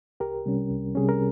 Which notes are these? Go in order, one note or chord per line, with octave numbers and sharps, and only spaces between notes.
C2 G4 A#4
C3 G3 C#4
C2
C3 G3 C#4 G#4
A#4